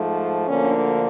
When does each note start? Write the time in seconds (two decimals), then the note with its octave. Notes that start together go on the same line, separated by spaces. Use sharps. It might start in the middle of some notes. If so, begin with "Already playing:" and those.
Already playing: G#2 F3 A3
0.48 D2 D3 F3 A#3 C#4